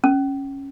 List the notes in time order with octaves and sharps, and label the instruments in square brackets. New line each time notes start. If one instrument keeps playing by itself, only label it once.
[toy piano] C#4